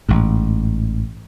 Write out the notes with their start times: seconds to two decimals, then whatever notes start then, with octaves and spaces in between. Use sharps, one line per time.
0.09 A1 G#2